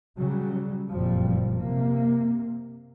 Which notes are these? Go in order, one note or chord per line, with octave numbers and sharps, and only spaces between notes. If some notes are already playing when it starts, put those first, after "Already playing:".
C#3 F#3 G3
F#1 F2 A#2 F3 G3
C3 A#3